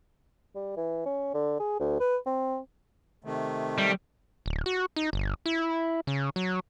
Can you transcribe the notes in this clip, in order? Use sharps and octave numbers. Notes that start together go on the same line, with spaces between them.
G3
E3
C#4
D3
G#4
D2
B4
C4
C3 D#3 A3
G3
D1
F#4
D#4
G1
E4
C#3
F#3